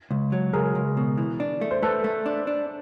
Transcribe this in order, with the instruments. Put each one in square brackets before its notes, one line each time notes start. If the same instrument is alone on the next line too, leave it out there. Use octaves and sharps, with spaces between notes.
[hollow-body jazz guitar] C#2
F#3
[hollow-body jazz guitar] C#2 [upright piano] G#4 A#4
[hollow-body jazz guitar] C#2
B2
E3
D4
A3
[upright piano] C5
[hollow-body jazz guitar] A3 [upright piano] A4 B4
[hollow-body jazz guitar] A3
D4
D4